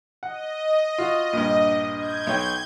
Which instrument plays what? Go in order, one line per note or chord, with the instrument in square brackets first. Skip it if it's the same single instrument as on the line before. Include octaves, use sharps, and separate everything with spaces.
[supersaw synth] D#5 [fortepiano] F#5
[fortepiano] F4 F#4
A#1 G2
[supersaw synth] G6 G#6
[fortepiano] B1 C#5 G5